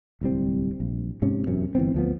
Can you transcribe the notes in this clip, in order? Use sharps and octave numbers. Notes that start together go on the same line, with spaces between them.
D1 C2 G3 C4
A#1
G#2 C3 C#4
E1 F#2 C3
G1 E3 B3 C4
D2 F3 B3